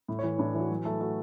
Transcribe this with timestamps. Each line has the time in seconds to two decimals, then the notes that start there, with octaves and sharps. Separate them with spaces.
0.08 A2
0.19 C#5
0.24 E3
0.39 A2 D4
0.55 E3
0.60 F#4
0.70 F#3
0.85 A3 A4
1.01 A3 F#4